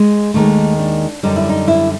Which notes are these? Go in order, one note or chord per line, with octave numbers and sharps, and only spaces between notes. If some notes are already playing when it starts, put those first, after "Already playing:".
Already playing: G#3
D#2 D#3 G#3 A3
D4
F#2 D3 G3 D#4
E4
D#4
E4